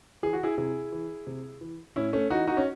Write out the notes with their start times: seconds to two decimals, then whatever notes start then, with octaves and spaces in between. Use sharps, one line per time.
0.23 E3 G#4
0.33 F#4
0.43 E4 G#4
0.58 C3 E4 G#4
0.92 E3
1.27 C3
1.61 E3
1.96 A2 C#4 E4
2.13 A3 C#4
2.30 E3 D#4 F#4
2.47 D#4 F#4
2.57 C#4